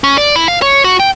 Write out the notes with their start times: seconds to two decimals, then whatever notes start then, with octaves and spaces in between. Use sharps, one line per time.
0.04 C#4
0.18 D5
0.36 E4
0.48 F5
0.62 C#5
0.84 F#4
1.00 G5